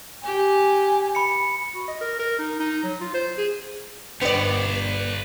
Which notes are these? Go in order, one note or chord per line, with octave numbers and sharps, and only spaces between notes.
G4 G#5
B5 C#7
F#4
D#5
A#4
A#4
D#4
D#4
F#3
F4
C5
G#4
G1 G2 A#3 B4 C#5 D5